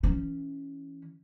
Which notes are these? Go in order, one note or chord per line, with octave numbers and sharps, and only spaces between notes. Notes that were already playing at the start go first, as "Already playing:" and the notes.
E3 C#4